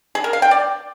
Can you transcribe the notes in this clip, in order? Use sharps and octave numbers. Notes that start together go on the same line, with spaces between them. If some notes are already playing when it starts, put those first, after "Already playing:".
G#4
A#4
F5
G5
D5